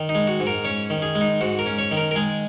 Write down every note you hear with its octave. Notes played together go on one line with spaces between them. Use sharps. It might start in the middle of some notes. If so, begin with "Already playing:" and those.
Already playing: D#3
D#4
G#3
F#4
G#2
A#4
C#4 C#5
D#3
G#4
G#3
D#4
G#2 F#4
A#4
C#4
C#5
D#3
A#4
A#4
G#3 G#4